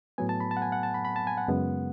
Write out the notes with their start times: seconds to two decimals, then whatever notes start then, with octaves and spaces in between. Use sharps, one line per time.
0.18 A2 F#3 B3 G#5
0.29 A5
0.40 B5
0.51 A5
0.57 F#5
0.62 G#5
0.72 F#5
0.83 A5
0.94 B5
1.05 B5
1.16 A5
1.27 G#5
1.37 F#5
1.48 F#2 C#3 G#3 B3